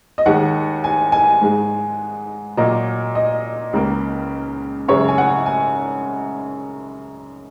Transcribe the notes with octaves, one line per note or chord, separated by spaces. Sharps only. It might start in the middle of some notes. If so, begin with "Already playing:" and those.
D#5
D#2 D#3 G#3 F#5
G#5
G#5
G#2 G#3
A#2 F#3 A#3 D#5
D#5
C#2 C#3 A#3
F#2 C#3 G#3 C#5
G#5
F#5
G#5